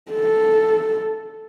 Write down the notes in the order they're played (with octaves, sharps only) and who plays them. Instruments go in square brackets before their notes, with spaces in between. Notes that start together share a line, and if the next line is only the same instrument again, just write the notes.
[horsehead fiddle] A4